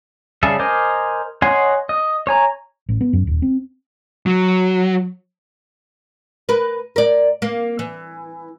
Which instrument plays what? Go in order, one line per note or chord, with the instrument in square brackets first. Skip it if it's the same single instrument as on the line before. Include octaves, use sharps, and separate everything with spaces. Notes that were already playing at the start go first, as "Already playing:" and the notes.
[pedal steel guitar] C#3 G3 G#4 A4 E5
A#4 C5 D#5 G#5 D6
C#5 D#5 F#5 G#5 C6
D#5
C#5 G#5 A#5
[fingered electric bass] A1
B3
F#2
D#1
C4
[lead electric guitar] F#3
[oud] A#4 B4
A#4 D5
A#3
E3